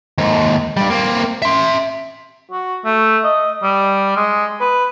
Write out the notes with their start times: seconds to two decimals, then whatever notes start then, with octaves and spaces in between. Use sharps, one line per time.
0.18 D#2 G#2
0.77 G2 G3
0.90 A#3 C4
1.42 E5 C6
2.51 F#4
2.85 A3
3.24 D#5
3.63 G3
4.17 G#3
4.61 B4